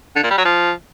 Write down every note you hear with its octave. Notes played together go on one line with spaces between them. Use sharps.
D3
A#2
G3
F#3
F3